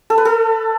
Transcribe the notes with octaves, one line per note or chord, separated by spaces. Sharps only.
A4
B4
A4